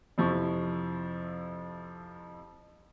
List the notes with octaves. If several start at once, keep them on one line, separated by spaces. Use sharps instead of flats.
F2 C3 F3 E4 C#6